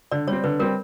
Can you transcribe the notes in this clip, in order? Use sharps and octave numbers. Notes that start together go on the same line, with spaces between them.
D3 D5
G3 C#5
C4
D3 B4
G3 C4 A#4